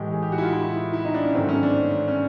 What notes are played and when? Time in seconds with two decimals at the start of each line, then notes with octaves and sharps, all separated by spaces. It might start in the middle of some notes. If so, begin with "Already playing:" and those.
Already playing: A2 E3 G#3 G4
0.12 G#4
0.22 G4
0.32 F#4
0.38 E4
0.43 F4
0.53 E4
0.93 E4
1.05 D#4
1.14 D4
1.24 C#4
1.34 G#2 D#3 F#3 A3 C4
1.49 C#4
1.63 D4
2.08 C#4